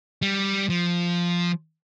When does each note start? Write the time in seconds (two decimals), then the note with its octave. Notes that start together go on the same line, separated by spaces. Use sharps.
0.22 G3
0.69 F3